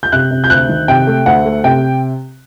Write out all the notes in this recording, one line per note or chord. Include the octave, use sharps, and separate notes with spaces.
G6
C3 F#6
C3
G6
D2 F#6
D#3
C3 G5
A3
D2 F#5
A3
C3 G5